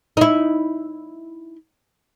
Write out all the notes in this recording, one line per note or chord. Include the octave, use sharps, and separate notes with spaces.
D#4 E4